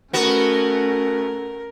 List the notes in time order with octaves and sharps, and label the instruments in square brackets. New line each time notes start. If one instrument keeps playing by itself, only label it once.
[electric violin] A3 C#4 [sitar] B3 F#4 [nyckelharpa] A#4